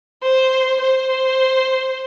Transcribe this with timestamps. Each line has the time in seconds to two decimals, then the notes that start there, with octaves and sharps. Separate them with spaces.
0.23 C5
0.81 C5